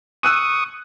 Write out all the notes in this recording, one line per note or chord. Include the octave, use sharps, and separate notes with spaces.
C#6 D#6 E6 F#6 D#7